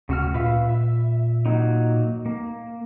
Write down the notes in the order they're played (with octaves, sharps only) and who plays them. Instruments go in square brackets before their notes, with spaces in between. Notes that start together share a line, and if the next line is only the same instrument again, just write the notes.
[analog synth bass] D2 [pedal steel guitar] C#3 F#4 F6
[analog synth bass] A#2 [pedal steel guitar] B4 E5 F5
[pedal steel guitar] E5
F#3 A#3 D#4
A#3